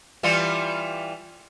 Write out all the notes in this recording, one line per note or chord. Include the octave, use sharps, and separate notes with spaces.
E3 G3 F4